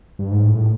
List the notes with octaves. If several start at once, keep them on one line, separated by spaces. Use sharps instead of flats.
G2
G#2
A2
A2